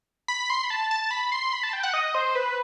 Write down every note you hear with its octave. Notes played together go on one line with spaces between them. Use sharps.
B5
C6
B5
A5
A5
B5
C6
B5
A5
G5
F#5
D#5
C5
B4